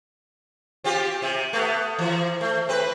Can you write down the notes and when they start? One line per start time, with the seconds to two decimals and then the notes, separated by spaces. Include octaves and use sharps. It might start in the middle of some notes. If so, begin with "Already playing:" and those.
0.84 C4 F4 G4
1.22 C3
1.53 A3 B3
1.99 E3
2.41 A3
2.69 C4 B4